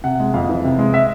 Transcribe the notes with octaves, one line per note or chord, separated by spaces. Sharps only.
C3 F#5
G#3
F2 F5
E3
C3
G#3
E5